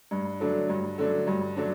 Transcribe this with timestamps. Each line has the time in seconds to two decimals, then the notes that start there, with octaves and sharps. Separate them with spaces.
0.11 G2
0.40 D3 F#3 A3 D4
0.69 G2
0.98 D3 F#3 A3 D4
1.27 G2
1.56 D3 F#3 A3 D4